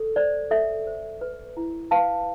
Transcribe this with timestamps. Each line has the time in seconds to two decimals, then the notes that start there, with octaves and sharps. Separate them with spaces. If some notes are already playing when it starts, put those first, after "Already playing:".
Already playing: A4
0.16 C5 D5
0.51 A4 E5
0.87 C5
1.21 B4
1.57 E4
1.91 B4 F5 A5